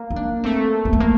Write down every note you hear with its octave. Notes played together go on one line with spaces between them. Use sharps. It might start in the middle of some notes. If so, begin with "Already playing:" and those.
Already playing: A#3
D#4
D4
A3 C4
A#3
A3
A#3